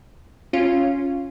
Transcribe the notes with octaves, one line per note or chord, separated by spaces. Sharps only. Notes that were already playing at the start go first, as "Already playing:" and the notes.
C#4 F4